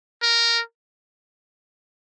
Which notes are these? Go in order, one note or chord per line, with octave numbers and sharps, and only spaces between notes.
A#4